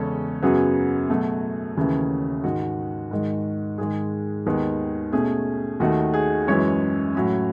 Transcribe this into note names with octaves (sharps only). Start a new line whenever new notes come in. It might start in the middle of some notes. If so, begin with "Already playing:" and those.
Already playing: E2 C#3 G#3 C#4 A4
F#2 C#3 F#3 B3 G#4
B2 F#3 A3
D#2 C#3 E3 A3 C#4
G#2 D#3 G#3 F#4
G#2 D#3 G#3
G#2 D#3 G#3 G#4
D#2 D#3 G#3 B3
B2 A3 C#4 G#4
D#2 D#3 A3 F#4
G#4
F#2 E3 G#3 C#4 C#5
A2 F#3 C#4